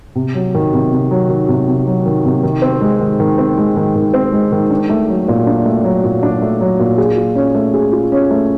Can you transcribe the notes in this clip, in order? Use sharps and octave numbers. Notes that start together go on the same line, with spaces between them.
C3
F#3
D#3
C3
C3
F#3
D#3
C3
C3
F#3
D#3
C3
D#3
C4
G#3
D#3
D#3
C4
G#3
D#3
D#3
C4
G#3
D#3
D4
A3
F#3
A#2
D4
A3
F#3
A#2
D4
A3
F#3
A#2
G#4
F4
C#4
A3
G#4
F4
C#4
A3